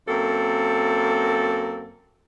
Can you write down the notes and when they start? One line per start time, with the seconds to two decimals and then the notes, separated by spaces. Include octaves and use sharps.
0.06 F#2 A#3 C4 A4